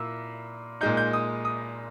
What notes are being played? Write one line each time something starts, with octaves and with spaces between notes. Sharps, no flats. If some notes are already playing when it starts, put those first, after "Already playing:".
Already playing: A#2 A#3 E4 E6
A#2 G#3 D#4 G6
G6
D#6
D#6